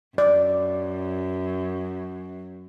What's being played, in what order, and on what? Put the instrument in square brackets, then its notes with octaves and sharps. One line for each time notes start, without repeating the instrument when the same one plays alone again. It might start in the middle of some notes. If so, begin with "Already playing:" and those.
[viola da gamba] F#2 [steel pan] D5